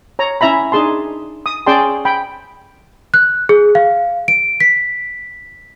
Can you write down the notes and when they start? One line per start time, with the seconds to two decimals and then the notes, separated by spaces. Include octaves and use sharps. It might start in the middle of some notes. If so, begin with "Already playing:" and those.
0.19 C#5 A#5
0.41 C#4 E4 E5 A#5 B5
0.72 D4 D#4 G#4 A5 C6
1.46 D#6
1.66 C#4 G#4 D5 G5 A5 C6
2.05 G5 B5
3.14 F#6
3.49 G#4
3.75 F5
4.28 D7
4.60 B6